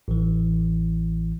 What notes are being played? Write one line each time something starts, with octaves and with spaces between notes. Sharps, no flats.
A1 E3